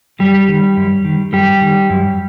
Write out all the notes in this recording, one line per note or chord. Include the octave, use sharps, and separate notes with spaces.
F#2 G3 G4
D#3
F#2
D#3
F#2 G3 G4
D#3
F#2